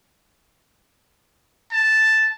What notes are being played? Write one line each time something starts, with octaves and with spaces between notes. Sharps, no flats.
A5